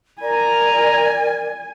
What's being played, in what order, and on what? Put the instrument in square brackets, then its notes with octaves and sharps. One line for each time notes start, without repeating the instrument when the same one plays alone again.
[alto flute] A#4 [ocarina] D5 [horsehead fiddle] G#5 [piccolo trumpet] A#5